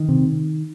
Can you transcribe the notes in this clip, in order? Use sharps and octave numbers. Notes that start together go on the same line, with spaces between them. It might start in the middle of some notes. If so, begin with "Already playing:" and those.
Already playing: D#3
C3